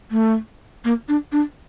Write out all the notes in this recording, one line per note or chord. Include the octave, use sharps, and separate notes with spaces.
A3
A#3
D4
D4